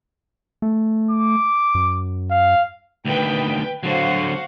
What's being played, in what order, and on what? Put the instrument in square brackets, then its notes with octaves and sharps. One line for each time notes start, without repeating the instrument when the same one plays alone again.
[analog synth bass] A3
[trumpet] D6
[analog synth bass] F#2
[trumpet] F5
[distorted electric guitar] D2 D#3 [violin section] B4 G5
[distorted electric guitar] D3 F#3 [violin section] F#4 C5 F5